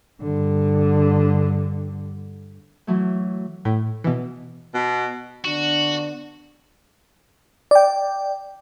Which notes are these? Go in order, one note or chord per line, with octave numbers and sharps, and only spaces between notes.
G2 D3
E3 F#3 A3
A2
B2 E3
B2
D3 B3 D4 F#4
D5 G5